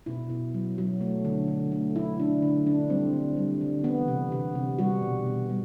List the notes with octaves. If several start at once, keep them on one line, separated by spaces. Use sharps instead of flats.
B2 E4
B2
F#3
F#3
A3
D3
D3
A3
A3 E4
D3 D4
D3
D3 D4
G3 C4
D3
G3
D3
E3 B3
C3
C3
C3
G3 F#4
B2
B2
G3